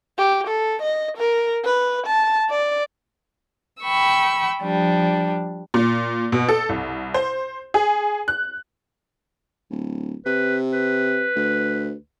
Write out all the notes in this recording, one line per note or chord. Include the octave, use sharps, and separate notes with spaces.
G4
A4
D#5
A#4
B4
A5
D5
G5 B5 C#6 E6
F3 G3 D4
A#2
B2
A4
C2
C5
G#4
F#6
D1
C3 B4
B4
D2